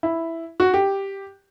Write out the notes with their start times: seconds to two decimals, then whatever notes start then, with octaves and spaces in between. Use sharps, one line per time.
0.03 E4
0.60 F#4
0.74 G4